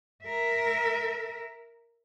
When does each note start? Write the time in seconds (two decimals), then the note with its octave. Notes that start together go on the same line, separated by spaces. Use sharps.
0.25 A#4 E5